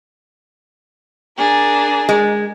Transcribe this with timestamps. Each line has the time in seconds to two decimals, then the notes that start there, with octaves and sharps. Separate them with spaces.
1.37 D4 G#4 A#4
2.09 G#3